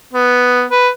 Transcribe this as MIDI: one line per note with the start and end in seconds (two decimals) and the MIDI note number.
0.13 0.65 59
0.70 0.89 71